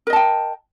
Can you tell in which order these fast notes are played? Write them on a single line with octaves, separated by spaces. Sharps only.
A#4 D#5 A5 G5